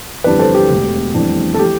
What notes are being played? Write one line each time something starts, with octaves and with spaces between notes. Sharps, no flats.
G1 F2 E3 G3 D4 B4 D5
A4 C5
G4
E1 D2 D3
F1 F2 E3 G3 D4
A4
E3 A3 G4